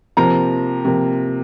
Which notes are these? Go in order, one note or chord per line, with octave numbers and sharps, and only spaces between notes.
C3 F3 A#3 A#5
C3 F3 A#3